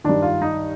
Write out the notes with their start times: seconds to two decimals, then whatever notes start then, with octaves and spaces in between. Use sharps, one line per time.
0.04 G2 D#3 D4
0.22 F4
0.42 D#4